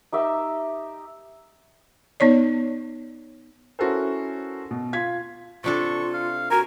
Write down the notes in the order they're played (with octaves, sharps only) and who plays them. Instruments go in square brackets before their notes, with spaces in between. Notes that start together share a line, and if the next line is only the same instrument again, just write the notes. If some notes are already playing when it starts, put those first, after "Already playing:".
[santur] D#4 G4 E5 A#5
[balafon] B3 D#4 C#5 D5
[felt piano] C#4 E4 F#4 A4 A#4 C5
B2
F4 G#6 B6
[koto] C3 D4 A4 [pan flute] F4 [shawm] C#6
[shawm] F5
[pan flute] F#4 [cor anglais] A#4 [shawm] G#5